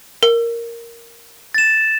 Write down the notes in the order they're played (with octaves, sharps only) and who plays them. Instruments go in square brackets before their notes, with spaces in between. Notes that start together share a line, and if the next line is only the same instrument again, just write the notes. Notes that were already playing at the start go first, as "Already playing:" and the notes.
[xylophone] A#4
[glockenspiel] A6 E7